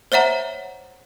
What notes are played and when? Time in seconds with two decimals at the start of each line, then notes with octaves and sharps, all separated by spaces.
0.12 C5 C#5 E5 F#5 A#5